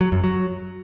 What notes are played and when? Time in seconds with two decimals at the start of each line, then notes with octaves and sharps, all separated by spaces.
0.01 F#3
0.12 F#2
0.24 F#3